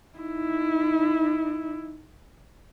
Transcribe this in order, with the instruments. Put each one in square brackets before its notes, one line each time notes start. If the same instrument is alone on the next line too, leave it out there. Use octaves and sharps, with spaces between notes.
[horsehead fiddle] D#4 E4